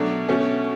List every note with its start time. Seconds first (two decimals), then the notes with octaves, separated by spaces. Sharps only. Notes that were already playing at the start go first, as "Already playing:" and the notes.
Already playing: B2 F#3 A3 D4
0.29 B2 A3 C#4